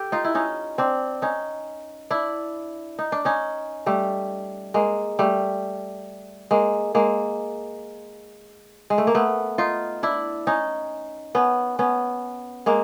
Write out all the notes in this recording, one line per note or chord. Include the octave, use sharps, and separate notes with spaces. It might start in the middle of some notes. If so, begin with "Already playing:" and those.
Already playing: G4 A4
D#4 F4
E4
C#4 D#4
C4 D4
C#4 D#4
D4 E4
D#4
D4
C#4 D#4
G3 A3
G#3 A#3
G3 A3
G#3 A#3
G#3 A#3
G#3
A3
A#3
A3 B3
D#4 F4
D4 E4
C#4 D#4
B3 C#4
B3 C#4
G#3 A#3